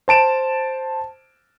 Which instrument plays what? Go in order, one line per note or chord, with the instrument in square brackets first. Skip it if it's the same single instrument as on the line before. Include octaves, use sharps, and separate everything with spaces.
[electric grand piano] C5 A5 D7 E7